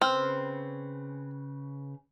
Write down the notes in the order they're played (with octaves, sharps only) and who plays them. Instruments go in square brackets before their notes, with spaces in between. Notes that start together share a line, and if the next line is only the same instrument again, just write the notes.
[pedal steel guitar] C#3 B4 F6 [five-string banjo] C4